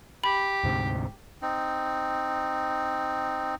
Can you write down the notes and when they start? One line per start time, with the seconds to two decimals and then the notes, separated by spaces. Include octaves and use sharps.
0.24 G4 B5
0.63 D2 G#2 C3
1.42 C4 D#4